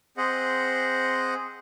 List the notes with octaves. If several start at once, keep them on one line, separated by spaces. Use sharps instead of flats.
C4 G#4 C5 D#5 F#5